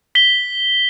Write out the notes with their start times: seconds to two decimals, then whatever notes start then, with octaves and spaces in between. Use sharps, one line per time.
0.15 B6 G7